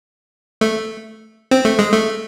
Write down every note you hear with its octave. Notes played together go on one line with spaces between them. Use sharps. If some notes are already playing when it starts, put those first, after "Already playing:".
A3
C4
A3
G#3
A3